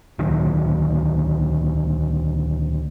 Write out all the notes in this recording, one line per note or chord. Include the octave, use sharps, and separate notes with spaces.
D2 A#2 D#3 F#3